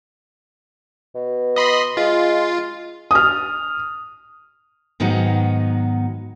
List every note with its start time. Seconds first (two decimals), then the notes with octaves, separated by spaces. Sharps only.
1.15 B2
1.56 D#5 B5 C6
1.97 G#3 F4
3.11 D#6 F6
5.00 G#2 D#3 F#3 B3 D#4